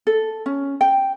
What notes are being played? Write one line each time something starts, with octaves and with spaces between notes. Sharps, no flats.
A4
C#4
G5